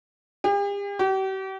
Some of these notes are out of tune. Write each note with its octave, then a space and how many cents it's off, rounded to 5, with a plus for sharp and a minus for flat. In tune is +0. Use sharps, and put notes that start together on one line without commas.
G4 +45
G4 -40